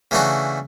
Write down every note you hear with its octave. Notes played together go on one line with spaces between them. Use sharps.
C#3 E3 A3 D4 F#4